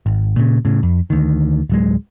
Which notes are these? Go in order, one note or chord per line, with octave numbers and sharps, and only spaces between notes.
G#1
A#2 C#3
A2 C#3
F2
D2 D#3
D1 F#3 G#3